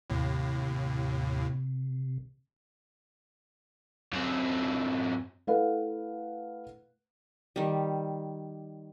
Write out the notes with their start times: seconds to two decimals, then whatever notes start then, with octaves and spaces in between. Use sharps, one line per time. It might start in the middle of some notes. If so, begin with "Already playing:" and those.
0.10 D#2 A2 C3
4.13 F#2 C4
5.47 A3 E4 A4 B4 F5 F#5
7.56 D#3 G3